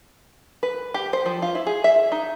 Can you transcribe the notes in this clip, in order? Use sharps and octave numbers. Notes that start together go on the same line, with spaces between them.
B4
G4
C5
F3
F4
E4
G#4
E5
D#4